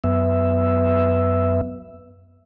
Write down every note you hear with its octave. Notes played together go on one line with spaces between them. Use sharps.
F#2 B3 E5